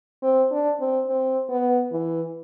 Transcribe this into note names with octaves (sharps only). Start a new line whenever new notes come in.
C4
D4
C4
C4
B3
E3